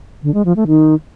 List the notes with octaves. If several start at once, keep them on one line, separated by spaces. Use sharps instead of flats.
D3
G#3
F3
A3
D#3